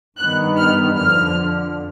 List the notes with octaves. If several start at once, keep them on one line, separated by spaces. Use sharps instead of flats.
G2 D#3 G3 B3 F#6
F6
F2 D3 F3 F6